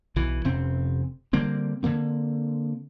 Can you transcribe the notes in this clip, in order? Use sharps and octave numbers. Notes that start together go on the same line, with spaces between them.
B1 E3
F1 C3 C4 C#4
D3 G3 A#3 C4
D3 F3 A#3 C4